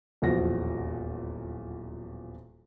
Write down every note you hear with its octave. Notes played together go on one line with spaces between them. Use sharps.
D#1 B1 E2 F3 F#4 A#6